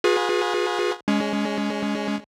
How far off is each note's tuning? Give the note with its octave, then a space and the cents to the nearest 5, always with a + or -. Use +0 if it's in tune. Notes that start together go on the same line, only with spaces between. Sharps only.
F4 +45 G#4 +0 B4 -15
G#3 +0 C#4 +25